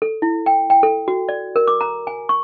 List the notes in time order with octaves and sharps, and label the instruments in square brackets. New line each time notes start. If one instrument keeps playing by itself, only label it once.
[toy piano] A4
E4
G5
G5
A4
F#4
D5
A#4
D6
A#5
G#5
C#6